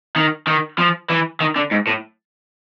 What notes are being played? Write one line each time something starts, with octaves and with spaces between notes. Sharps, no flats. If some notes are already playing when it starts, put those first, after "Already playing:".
D#3
D#3
F3
E3
D#3
D3
G#2
A2